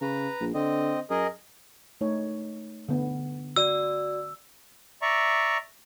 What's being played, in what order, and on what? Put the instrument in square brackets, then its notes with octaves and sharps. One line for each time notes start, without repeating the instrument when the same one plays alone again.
[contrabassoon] C#3 [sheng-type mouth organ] B4 A#5
[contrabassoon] A#1
[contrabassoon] D3 [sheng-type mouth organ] C4 D#5
[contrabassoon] F#2 [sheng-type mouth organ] G#4 A#4 D#5
[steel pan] A3 D#4 C#5
D3 B3
[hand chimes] F#4 D5 [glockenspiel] E6
[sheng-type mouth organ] D5 E5 A#5 C#6